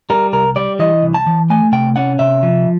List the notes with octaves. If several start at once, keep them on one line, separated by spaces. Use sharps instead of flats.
G3 A#4
C2 A#4
G3 D5
E3 D#5
C2
A5
E3
A3 G#5
C3 G5
C#4 F#5
C3 E5
F3